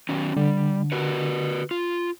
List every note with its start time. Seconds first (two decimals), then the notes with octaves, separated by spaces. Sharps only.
0.09 D#3 F#3 C#4
0.37 D3 G3
0.92 F#4 A#4 B4
1.71 F4